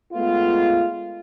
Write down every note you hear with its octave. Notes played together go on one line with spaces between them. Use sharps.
G#3 A3 B3 F4